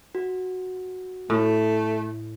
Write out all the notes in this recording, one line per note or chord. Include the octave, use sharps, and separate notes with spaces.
F#4
A2 A3